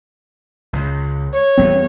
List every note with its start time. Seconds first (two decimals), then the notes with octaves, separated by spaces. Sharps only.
0.73 C#2
1.33 C#5
1.58 E2 G3 B3 C4